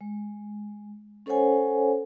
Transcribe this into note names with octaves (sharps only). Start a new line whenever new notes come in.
G#3
C#4 A4 C5 C#5 F#5 G#5